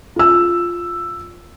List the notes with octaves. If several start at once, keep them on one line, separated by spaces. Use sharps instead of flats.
F4 E6